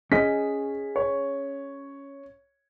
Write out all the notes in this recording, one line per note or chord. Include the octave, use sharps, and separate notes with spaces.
C#4 G#4 D#5 B6
C#5